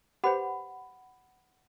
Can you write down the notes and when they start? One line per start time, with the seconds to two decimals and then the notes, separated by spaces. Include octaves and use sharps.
0.24 G4 B4 C5 F#5 B5